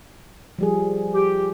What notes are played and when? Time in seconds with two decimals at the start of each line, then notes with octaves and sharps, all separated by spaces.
0.59 F3 G3 G#4
1.14 G4